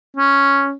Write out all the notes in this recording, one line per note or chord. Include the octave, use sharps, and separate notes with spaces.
C#4